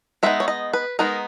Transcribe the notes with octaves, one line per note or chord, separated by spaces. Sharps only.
G#3 B3 D#4 E5
C#5
D#5
B4
G#3 B3 D#4 A#4